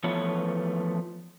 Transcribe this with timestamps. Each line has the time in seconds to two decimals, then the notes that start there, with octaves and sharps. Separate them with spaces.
0.04 E3 F3 A3 B3 B4 C#5